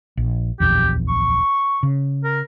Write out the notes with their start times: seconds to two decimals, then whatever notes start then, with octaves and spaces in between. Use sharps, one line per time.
0.17 A#1
0.60 D1 A#1 E2 G4
1.08 C#6
1.83 C#3
2.24 A#4